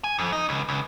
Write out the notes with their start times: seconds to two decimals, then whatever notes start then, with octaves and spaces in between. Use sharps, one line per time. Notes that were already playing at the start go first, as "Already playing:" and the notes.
0.04 G#5
0.19 F2
0.32 D#4
0.49 C#2
0.69 C#2